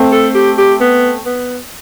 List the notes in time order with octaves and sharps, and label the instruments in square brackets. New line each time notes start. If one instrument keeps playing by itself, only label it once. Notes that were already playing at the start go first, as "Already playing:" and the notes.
Already playing: [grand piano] A3 C4
[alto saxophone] A4
G4
G4
B3
B3